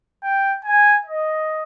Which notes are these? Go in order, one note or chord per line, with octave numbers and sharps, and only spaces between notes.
G5
G#5
D#5